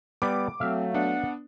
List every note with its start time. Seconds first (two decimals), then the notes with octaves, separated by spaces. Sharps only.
0.22 G3 B3 D6
0.60 F#3 A3 C4 E5 F5
0.94 B3 D4 F#5